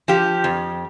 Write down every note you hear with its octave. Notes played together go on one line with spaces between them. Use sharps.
F3 G4
F2